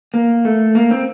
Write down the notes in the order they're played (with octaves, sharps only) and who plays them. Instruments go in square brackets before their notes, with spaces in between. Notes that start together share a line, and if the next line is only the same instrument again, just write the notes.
[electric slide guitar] A#3
A3
A#3
C4